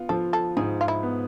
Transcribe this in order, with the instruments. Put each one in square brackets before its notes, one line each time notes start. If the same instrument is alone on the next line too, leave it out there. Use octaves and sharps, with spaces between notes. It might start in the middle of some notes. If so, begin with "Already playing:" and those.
Already playing: [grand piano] B3 F4
[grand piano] F3 [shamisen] A4
[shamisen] A4
[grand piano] G#2 [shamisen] G#4
[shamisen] F4
E4
[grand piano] B3